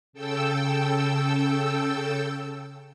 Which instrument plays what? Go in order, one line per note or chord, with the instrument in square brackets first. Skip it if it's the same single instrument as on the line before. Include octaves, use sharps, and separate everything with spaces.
[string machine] C#3 A4 G5 E6